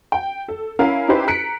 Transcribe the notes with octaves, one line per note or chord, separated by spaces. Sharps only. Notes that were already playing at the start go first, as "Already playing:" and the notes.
G5
A4
C#4 E4 A#4 F5
C#4 D#4 E4 G4 B4 C5
A#5 F#6 B6 C#7 D7